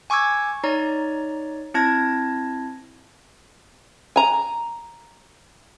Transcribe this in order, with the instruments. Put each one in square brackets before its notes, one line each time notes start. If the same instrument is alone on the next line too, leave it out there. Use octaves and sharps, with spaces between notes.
[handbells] G#5 C#6 D6 E6 G#6
D#4 C#5 D5 A#5
C4 E4 A5 G#6 A#6
[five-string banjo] G#5 A#5